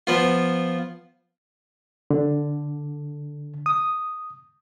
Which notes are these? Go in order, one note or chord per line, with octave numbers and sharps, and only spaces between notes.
F3 B3 F4
D3
D#6